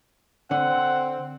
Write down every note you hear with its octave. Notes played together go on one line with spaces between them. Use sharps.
D3 C4 F#5